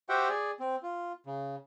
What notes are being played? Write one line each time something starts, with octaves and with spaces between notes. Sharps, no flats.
F#4 G4 C5 E5 F#5 G5
G#4 D5
C4
F4
C#3